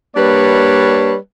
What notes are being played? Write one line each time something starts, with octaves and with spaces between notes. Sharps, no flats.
G3 A#3 D4 B4 C#5